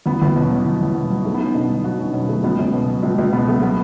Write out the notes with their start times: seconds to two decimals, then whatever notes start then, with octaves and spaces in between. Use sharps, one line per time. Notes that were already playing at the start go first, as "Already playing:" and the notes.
0.06 E2 B3
0.22 E2 B3
0.36 B2 C#4
0.50 F#3
0.66 E2
0.81 E2
0.95 B2
1.10 F#3
1.24 B1 A3
1.34 B3
1.40 B1
1.45 C#4
1.55 B2 D4
1.70 F#3
1.84 B1 F#4
1.99 B1 C#4
2.14 B2 C#4
2.29 F#3 A3
2.43 C#2 B3
2.58 C#2 C#4
2.73 B2
2.88 F#3
3.03 C#2
3.18 C#2
3.32 B2 B3
3.47 F#3 A3
3.62 F#3 B3